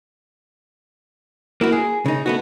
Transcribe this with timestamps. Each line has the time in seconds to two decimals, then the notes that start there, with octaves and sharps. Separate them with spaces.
1.61 A#3 E4 F#4
1.72 G#4
2.06 C#3 D#4
2.26 A3 B3 F#4